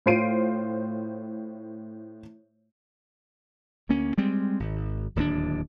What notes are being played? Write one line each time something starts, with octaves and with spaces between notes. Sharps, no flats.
A2 F4 C5 C7 D7 D#7
D2 A#3 C#4
G3 G#3 C4
G#1
D1 D#2 F3 D4